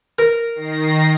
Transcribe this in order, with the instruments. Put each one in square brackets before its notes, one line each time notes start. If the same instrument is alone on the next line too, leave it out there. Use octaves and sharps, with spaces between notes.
[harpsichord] A#4
[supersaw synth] D#3 A#6 C7